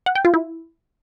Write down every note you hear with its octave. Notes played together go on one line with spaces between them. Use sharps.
F#5
G5
F4
E4